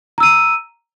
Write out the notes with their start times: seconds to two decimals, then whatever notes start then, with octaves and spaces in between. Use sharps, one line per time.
0.18 A#5
0.20 E6
0.23 D#7